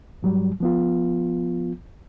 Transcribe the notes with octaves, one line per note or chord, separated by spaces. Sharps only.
G#2 F#3 G3
F3 B3 F4